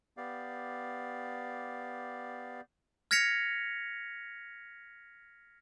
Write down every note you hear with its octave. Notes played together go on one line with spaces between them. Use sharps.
B3 G4 D5 F5
F6 G#6 A#6 B6 C#7 F7